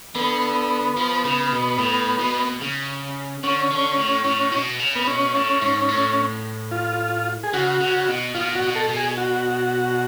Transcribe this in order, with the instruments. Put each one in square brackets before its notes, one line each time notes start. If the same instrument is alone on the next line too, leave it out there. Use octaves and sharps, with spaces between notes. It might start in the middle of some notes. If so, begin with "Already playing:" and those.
[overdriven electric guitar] D3 [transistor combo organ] B3
[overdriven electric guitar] F3
C#3
B2
A2
B2
C#3
[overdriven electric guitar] D3 [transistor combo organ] C#4
[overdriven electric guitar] D3
A2
A2
B2
C#3
[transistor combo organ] B3
[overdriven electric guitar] B2 [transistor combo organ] C#4
[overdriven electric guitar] A2
G#2
A2
[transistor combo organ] F4
G#4
[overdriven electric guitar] C#3 [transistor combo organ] F#4
[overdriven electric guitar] C#3
B2
[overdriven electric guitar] B2 [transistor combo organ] F4
[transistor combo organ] F#4
[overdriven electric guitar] B2
[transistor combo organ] A4
[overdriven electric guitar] B2
[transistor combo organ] G#4
F#4